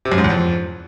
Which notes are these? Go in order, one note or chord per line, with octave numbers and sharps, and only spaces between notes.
C3
F#2
G#2
E2
F2